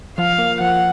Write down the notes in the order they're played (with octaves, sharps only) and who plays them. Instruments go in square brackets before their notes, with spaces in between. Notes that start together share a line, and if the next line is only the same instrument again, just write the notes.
[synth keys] F3 [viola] F5
[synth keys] A#3
[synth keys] F3 [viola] F#5